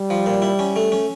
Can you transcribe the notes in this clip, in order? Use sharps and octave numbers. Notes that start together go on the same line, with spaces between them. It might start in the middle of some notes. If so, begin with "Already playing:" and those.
Already playing: G3
F3
A#2
E4
C#4
A3
C#4